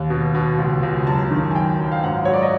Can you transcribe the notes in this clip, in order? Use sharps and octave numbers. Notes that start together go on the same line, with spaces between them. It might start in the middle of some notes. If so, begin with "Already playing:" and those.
Already playing: D#2
B2
B2
C#2
C#2
F#2 A5
D#3
G#5
F#2 G5
F#2
F5
G#2 F#5
F#3 C#5
D5
D#5